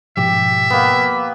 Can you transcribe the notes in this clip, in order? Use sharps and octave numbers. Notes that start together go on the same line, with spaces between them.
G#2 B2 F3 G4 E5
A#3 B3